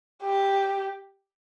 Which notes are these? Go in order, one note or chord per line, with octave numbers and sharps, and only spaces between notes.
G4